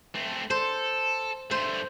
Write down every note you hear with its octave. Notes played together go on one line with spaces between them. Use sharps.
A3 C4
A4 C5
G2 A3 C5